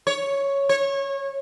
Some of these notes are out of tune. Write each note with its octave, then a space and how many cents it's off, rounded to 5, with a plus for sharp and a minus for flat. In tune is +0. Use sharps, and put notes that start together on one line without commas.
C#5 +0
C#5 -25